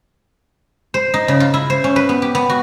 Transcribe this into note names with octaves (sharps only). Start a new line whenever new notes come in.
C5
D#4
C#3
F4
E4
C5
C#4
B4
B3
G4
B3
F#4